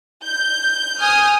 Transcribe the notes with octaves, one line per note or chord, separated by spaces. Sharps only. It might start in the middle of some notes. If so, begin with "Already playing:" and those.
G6
G#5 D#6 F6